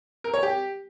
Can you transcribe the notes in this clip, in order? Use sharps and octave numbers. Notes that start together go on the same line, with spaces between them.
A#4
C#5
G4